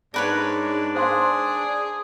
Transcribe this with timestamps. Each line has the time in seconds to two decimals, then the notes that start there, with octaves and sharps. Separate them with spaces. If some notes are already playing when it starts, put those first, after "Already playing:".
0.14 G#2 D4 A#4 B4 C#5 D5
0.95 G#4 C5 F5 C6